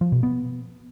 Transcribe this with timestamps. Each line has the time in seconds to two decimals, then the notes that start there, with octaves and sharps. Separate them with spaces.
0.01 F3
0.12 B2
0.23 B3